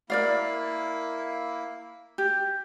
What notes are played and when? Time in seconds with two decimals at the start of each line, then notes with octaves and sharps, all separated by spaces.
0.10 A#3 E4 A#4 D5 F5
2.18 G4